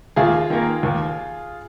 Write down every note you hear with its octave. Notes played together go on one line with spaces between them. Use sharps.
D#2 F4 G#4
D#3 A#3
D#2